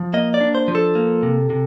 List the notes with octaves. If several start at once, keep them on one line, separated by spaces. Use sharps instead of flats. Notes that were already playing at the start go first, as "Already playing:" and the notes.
Already playing: F3
A#3 D#5
D5
D4
C5
F3
A4
A#3
C3
C3